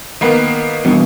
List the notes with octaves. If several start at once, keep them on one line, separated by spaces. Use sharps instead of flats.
D#3 A#3 B3
E2 G2 B2